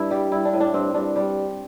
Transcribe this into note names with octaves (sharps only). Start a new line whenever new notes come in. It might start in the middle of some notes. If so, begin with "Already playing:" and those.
Already playing: G2 D4 E4
G3 G4
G3 E4
D4
A2
D4
G2 C4
G2 D4
G3 G4